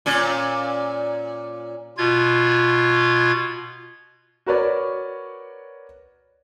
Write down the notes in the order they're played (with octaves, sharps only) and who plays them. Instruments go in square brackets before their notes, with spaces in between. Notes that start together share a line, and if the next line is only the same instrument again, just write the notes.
[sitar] A#2 C#4
[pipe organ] B2 F4 G#6
[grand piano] F#4 A#4 B4 C#5 D5